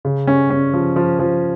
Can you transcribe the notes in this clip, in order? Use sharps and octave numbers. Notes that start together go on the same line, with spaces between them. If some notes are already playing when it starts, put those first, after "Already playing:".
C#3
C#4
C#4
F3
F3
F3